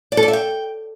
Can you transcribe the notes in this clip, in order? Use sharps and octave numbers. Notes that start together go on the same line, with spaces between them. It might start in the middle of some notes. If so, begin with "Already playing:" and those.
D5
A4
D5
E5
G5